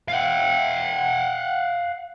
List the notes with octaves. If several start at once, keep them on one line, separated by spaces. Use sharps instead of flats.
F5 F#5